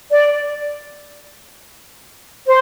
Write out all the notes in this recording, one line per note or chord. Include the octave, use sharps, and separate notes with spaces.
D5
C5